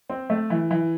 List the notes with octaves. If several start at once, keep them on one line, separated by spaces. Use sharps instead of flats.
C4
A3
E3
E3